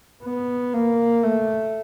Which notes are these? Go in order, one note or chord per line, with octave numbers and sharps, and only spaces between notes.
B3
A#3
A3